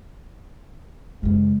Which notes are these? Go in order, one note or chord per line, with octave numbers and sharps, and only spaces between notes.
F#2 C#3 G#3